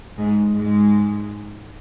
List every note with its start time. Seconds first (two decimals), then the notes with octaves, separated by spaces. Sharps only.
0.17 G#2 G#3
0.55 G#2 G#3